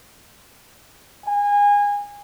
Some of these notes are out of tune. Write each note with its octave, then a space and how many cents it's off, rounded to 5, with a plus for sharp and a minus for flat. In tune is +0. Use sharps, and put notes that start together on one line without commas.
G#5 -25